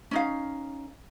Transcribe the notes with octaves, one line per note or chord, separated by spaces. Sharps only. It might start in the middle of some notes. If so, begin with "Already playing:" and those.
C#4 D#4 F5